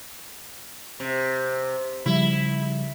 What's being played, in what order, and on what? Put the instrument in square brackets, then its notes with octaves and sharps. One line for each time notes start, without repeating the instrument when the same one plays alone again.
[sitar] C3
[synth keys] C#3 F3 G3 [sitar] E4